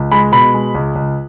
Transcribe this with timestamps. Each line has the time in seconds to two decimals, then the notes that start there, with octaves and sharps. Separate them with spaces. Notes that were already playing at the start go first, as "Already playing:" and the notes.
Already playing: C#2
0.12 G#3 B5
0.32 B2 B5
0.54 G#3
0.74 C#2
0.95 C#2